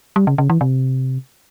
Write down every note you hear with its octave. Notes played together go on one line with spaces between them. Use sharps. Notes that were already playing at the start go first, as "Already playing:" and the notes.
G3
C#3
C#3
E3
C3